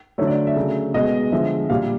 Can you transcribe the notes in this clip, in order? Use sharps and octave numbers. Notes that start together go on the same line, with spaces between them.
D3 F#3 A3 C#5
D5
E5
C#3 F#3 A3
B2 G#3 D#5
D3 F3 G#3 E5
A#2 G3 F5